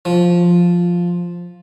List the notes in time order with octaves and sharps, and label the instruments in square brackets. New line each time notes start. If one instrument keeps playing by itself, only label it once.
[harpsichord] F3